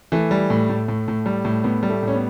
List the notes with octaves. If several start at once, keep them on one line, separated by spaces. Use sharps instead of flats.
E3 A3
G3
A2
A2
A2
A2
G3
A2
A2 B3
G3
A3
A2
C#4
B3